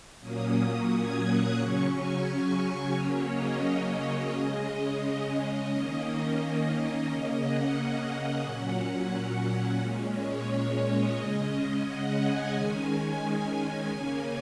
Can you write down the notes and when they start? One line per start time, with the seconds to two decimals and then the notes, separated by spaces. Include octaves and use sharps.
0.21 A#2 F#3 A#3 C#4 D#6
0.90 G#6
1.24 F#6
1.57 C#3 F#3 C#4 C#6
1.92 G#5
2.94 C#3 F#3 A#3 C#4 C#5
3.29 D#5
4.32 C#3 G#3 C#4
4.66 D#5
5.34 D#5
5.68 D#3 A#3 C#4
6.71 D#5
7.06 C#3 A#3 C#4
7.40 F#5
8.42 A#2 F#3 C#4 F#5
9.79 A#2 G#3 C#4
10.14 C#5
10.82 D#5
11.17 C#3 G#3 C#4 D#5
11.85 F#5
12.19 G#5
12.54 D#3 G#3 C#4
13.22 G#5
13.91 C#3 A#3 C#4